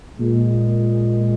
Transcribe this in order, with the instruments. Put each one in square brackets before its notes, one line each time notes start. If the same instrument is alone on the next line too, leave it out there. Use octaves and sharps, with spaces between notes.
[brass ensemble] A#2 G#3